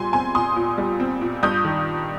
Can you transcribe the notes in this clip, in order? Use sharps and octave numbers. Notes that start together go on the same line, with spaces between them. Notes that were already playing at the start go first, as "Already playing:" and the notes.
Already playing: A#2 G3 G#5 C6
C4 G#5 C6
A#2 C6 D#6
A#2
G3
C4
A#2
G2 D#6 G6
D#3